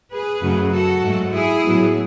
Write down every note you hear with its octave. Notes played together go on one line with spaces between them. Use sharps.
G#4 B4
F#2 C#3 F#3 A3
F#4 A4
G#2 F#3 A3
E4 G#4
A2 F#3 B3